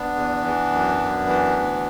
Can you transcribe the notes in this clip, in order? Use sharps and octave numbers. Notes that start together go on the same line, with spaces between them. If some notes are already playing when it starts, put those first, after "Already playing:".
Already playing: B3 D4
E2
E3
F#2
F#2
E3
D2